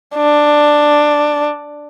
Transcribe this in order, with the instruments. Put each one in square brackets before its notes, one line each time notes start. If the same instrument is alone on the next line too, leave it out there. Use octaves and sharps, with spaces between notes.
[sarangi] D4